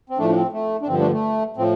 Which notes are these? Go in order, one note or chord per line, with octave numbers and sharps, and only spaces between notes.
C4
A2 F3 A3 D4
D4
C4
A3
D4
G2 D3 F3 C4
A3 D4
A3
A2 F3 C4